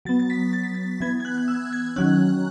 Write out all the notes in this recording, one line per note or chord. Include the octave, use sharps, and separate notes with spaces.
F#3 B3 A6
A6
B6
A6
B6
A6
E3 B3 G#6
G#6
F#6
F#6
E6
G#6
D#3 F#3 C#4 F#6